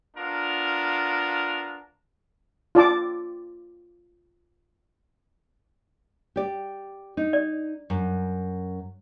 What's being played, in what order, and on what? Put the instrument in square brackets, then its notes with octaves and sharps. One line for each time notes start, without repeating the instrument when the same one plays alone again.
[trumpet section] B3 D4 F4 A#4
[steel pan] F4 D5 A5 D6
[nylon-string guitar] G4 D5
D#4
[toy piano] D5
[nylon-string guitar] F#2